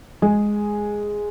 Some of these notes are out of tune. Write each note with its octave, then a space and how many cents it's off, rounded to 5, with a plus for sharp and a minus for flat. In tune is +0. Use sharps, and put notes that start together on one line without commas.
G#3 +0 G#4 +0